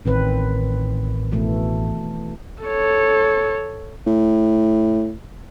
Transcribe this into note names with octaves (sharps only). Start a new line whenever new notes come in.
A1 D#3 C4 B4
B2 E3 A3
A4 C#5
A2